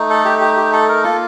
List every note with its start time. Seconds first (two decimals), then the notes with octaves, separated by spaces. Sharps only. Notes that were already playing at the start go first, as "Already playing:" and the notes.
Already playing: A3 D#4
0.10 A4
0.25 G4
0.41 G4
0.57 G4
0.73 A4
0.89 A#4
1.04 A#3 F4 A4